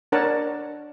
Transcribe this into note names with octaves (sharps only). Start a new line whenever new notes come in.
D4 A#4 C#5 F#5 A5